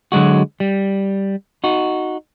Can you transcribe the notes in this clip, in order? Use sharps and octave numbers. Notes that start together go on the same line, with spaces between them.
D3 F#3 G#3 F#4
G3
D#4 F#4